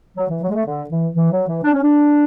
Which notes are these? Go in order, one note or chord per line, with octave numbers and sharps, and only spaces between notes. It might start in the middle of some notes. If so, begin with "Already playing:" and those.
F#3
E3
F#3
G#3
A3
D3
E3
E3
F#3
E3
D4
C#4
D4